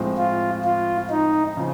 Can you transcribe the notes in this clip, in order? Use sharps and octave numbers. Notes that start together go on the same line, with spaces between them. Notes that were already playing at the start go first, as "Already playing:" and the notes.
Already playing: A2 F3 G#3 C4
F4
F4
D#4
C#3 F3